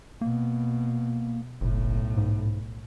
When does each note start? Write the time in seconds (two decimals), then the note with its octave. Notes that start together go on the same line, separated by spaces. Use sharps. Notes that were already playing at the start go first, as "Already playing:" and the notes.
0.21 B2 A#3
1.61 F#1 B1 A2
2.17 G#2